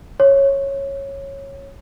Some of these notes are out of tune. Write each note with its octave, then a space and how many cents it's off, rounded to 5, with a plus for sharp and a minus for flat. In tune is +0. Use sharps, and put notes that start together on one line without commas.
C#5 -10